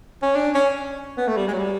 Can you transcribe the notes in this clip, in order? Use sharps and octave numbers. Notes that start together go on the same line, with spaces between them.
C#4
D4
C#4
B3
A3
G3
G#3
F#3
G3